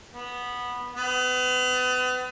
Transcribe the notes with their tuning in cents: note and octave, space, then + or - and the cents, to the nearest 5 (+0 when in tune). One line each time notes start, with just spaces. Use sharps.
B3 -10
B3 +35